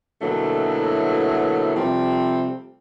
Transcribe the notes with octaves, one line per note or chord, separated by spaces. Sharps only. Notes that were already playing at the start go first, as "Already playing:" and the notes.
B2 D3 E3 F#3 A3 A#3
C3 F3 G3 A3 C4